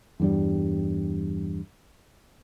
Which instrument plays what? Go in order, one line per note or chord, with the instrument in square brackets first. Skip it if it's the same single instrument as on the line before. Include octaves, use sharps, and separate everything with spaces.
[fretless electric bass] E2 G2 G3